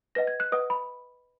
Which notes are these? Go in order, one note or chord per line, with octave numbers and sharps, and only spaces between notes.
B4 D#5 F#5 A#6
G#6
F#6
B4 D#5 F#5 D#6
B5